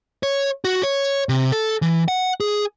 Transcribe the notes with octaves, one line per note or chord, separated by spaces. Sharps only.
C#5
F#4
C#5
C3
A4
E3
F#5
G#4